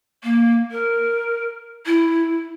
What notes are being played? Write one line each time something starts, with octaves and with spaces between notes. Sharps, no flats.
A#3
A#4
E4